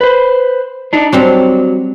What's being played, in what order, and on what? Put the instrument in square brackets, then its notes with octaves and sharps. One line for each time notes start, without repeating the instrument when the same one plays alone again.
[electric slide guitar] B4 C5
D4 D#4
[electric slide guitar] F#3 [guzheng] G3 C4 D4